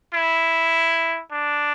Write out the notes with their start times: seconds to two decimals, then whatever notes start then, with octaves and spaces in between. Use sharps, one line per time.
0.14 E4
1.32 D4